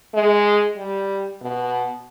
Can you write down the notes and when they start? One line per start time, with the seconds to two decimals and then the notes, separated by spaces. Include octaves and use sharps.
0.14 G#3
0.77 G3
1.41 B2